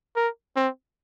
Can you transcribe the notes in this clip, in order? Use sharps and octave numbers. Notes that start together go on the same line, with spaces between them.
A#4
C4